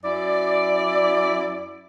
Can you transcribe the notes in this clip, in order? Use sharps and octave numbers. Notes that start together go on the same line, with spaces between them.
F#2 E4 D5